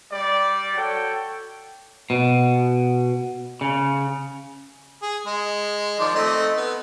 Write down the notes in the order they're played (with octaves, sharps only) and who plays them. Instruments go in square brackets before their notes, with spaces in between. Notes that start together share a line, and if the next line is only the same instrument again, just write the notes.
[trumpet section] G3 D5
F#4 A4 C#5 G5
[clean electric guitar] B2
C#3
[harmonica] G#4
G#3
D#3 F3 D5
A3 C4 D#4
B3